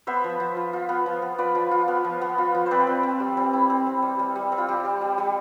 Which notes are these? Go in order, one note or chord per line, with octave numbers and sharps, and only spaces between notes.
B3 C5 E5
F3
F3
F4
F4
B3
F3
B3
F4 B4 D5
F3
F4
B3
F3
B3
F4
F3
C5
C4 B4 D5
C4
C4
G3
C4
E4
C4
C4
G3
G3
G3
C4
F4
G3 G4
G3
G3
G3